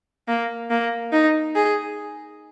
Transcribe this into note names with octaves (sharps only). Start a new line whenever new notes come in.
A#3
A#3
D#4
G#4